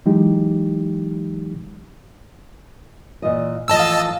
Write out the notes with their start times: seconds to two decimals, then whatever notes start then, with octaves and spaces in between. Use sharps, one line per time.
0.06 E3 F#3 G#3 D#4 G4
3.22 A#2 E3 D#5
3.68 A2 E3 F3 D#5 A5 E6
3.79 F5